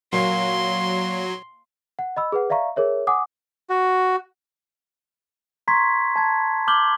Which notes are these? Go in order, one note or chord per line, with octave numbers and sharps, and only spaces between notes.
A#2 F#3 C6
F#5
D#5 B5 E6
G#4 B4 F#5
D5 E5 F5 A#5 C#6
G#4 A#4 C#5 E5
F#5 G#5 D6 D#6
F#4
A#5 C6 C#6 G#6 B6
A5 G#6
D6 F6 G6 F#7 G7